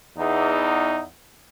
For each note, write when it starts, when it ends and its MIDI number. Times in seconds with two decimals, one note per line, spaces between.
0.18 1.03 40
0.18 1.02 63